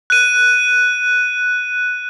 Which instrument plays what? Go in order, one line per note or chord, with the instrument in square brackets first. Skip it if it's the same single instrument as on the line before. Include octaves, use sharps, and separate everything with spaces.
[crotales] F#6 D#7